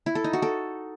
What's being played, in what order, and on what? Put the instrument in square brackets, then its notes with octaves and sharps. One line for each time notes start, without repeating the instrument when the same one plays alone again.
[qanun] E4
A4
D#4
F#4
A4